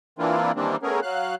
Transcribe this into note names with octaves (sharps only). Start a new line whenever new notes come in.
E3 A#3 C4 D4 E4 F4
D#3 E3 G3 A#3 C4 D4
A3 B3 C#4 G#4 A#4
F#3 F5 F#6